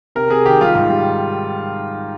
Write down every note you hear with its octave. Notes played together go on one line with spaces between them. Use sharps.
C3 A#4
C3 G#4
D#3 G4
G3 F4
G#2
G3